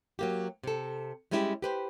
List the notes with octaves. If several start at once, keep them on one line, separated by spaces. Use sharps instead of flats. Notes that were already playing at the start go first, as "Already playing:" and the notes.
F#3 A#3 G4
C3 A4
G3 G#3 C#4 E4 F#4 G4
G4 B4 C5